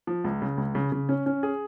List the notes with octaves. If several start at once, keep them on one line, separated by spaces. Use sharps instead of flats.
F3
C#2
C#3
C#2
C#3
C#3
C#4
C#4
G#4